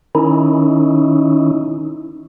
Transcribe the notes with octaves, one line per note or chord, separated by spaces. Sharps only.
D#3 C#4 D#4 E4